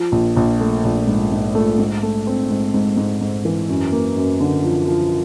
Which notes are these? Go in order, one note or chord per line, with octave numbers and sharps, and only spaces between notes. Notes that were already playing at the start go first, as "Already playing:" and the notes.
Already playing: F3
A#1
A#1
A3
A#1
G#2
G#2
A3
G#2
A3
C4
G#2
G#2
G#2
G#2
E3
F#2
A#3
F#2
D3
F3
F3